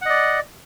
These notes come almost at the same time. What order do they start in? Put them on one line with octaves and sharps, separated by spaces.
F#5 D#5 D5